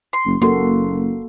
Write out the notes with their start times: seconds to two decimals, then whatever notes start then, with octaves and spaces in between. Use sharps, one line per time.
0.13 C6
0.26 F#1
0.42 F#1 A#3 F#4 A4 C6